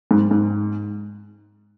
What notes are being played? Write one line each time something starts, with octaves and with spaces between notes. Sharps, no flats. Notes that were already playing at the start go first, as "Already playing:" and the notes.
G#2
G#2